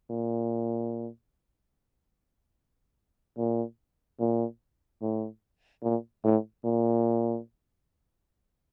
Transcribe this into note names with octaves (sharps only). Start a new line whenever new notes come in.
A#2
A#2
A#2
A2
A#2
A2
A#2